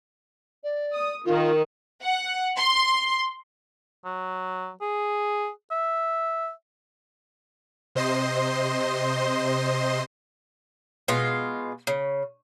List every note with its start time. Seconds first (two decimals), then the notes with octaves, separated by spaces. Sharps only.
0.64 D5
0.93 D#6
1.25 D#3 F4
2.03 F#5
2.57 C6
4.05 F#3
4.81 G#4
5.71 E5
7.95 C3 C5 D#5 C6
11.08 B2 G#3 F4
11.87 C#3